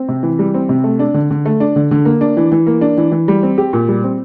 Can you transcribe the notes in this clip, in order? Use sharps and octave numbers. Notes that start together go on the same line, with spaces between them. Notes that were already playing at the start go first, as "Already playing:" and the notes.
Already playing: C4
C3
E3
G3
C4
C3
A3
D4
D3
D3
A3
D4
D3
D3
A#3
D4
E3
E3
A#3
D4
E3
E3
G3
C4
G4
A#2
G3
C4